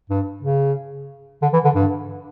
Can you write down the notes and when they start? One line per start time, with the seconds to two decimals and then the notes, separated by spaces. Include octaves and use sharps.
0.10 G2
0.43 C#3
1.42 D3
1.53 E3
1.64 D3
1.75 G2